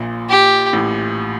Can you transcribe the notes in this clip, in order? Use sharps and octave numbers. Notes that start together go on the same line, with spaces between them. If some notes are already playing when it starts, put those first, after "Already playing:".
Already playing: A#1 A#2
G4
A1 A2